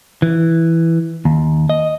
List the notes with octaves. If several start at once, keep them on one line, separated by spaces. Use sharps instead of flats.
E3
D#2
D#5